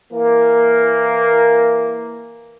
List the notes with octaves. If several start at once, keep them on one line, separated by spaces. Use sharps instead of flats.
E3 A#3